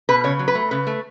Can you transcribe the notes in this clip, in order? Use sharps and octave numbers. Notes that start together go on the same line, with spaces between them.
B2 B4
C#3 C#5
F#3
B4
A3
C#3 B4
A3